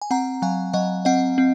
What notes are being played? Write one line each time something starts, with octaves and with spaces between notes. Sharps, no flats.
G#5
C4 F#5 A#5
F#3 F5 G#5
F#3 D#5 F#5
C4 D#5 F#5
C4